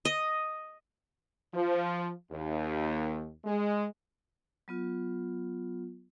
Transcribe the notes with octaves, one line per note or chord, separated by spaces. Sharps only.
D#5
F3
D#2
G#3
F#3 B3 F4